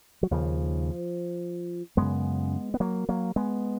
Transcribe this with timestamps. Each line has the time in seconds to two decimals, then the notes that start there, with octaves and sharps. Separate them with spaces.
0.23 F#3
0.31 D#2 C#3 F3
1.97 F#2 C#3 G#3 B3
2.74 B3
2.80 F#3 A#3
3.09 F#3 A#3
3.36 G#3 B3